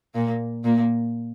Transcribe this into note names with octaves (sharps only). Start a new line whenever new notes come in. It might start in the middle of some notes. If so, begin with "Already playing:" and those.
A#2 A#3
A#2 A#3